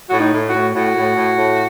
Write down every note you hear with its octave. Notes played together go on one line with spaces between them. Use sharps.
A2 F#4
D#4
A2
F#4
A2
A2 F#4
A2
A2
A2